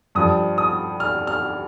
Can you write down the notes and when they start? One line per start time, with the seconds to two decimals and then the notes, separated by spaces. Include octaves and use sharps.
0.15 G2 F3 D#6
0.58 D#6
1.00 F6
1.27 F6